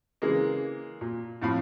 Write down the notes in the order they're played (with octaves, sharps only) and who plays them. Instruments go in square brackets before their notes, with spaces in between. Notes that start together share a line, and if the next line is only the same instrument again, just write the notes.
[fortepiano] C#3 E3 G#3 A#3
A#2
F2 A2 F5 B5